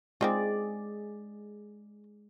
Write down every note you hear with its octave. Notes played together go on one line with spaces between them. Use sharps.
G#3 C4 D#4 F4 G#4 D5